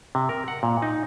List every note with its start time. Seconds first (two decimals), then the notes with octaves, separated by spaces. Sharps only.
0.15 C3
0.29 A#4
0.48 F#5
0.63 A#2
0.82 D#4